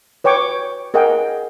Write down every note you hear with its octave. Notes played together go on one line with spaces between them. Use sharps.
B4 C#5 G5 C#6 D6
G#4 A#4 D#5 F#5 G5